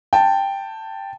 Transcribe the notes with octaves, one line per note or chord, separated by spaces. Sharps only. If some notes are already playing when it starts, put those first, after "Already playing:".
G5 A5